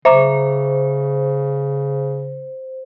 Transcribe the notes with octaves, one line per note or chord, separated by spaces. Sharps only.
C#3 C5 E5 A#5 D6